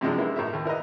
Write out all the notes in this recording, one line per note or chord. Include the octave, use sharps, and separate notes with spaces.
F#2 C3 F3 G#3 D4
G#3 A#3 B3 E4
A2 A#4 E5
D#2
E4 A#4 B4 D#5